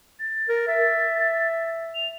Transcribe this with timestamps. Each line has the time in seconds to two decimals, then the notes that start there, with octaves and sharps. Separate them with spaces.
0.20 A6
0.49 A#4
0.68 E5 A6
1.95 F7